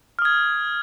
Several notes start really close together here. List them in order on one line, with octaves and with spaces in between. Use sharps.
F6 D#6 G#6